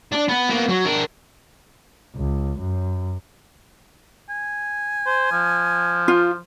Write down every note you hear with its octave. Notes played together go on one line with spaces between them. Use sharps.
D4
B3
A#3 B3
F#3
D4 A#4
C#2
F#2
G#5
C5
F3
F4